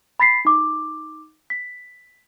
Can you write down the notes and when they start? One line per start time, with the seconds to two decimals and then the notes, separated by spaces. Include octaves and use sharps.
0.20 B5 A6 B6 C7
0.45 D#4 D6
1.50 B6